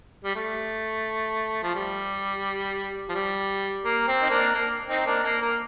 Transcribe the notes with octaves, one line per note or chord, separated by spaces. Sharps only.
G3
A3
F3
G3
F3
G3
A#3
C4
D#4
A#3 D4
A#3
C4 D#4
A#3 D4
A#3
A#3